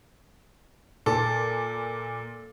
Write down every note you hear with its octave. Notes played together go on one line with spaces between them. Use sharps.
A#2 A4